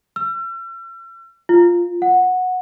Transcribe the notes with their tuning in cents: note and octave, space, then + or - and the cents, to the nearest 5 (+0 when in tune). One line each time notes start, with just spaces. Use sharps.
E6 +45
F4 -5
F#5 -10